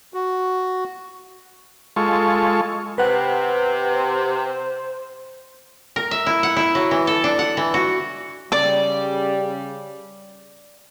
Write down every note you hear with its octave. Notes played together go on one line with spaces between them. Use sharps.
F#4
G#3 F4 A4 C#6
C3 B4 C5 F#5
A#4
E5
E4
F#5
E4
F#3
E3
A4
D4
F#5
E3
F#4
C#3 G3 D5 D6